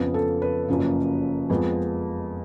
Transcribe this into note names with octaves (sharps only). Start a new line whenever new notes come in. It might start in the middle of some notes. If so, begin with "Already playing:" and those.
Already playing: F2 C#3 F3 B3
A4
B4
F#1 F#2 C#3 F3
F2 F3 G#3 B3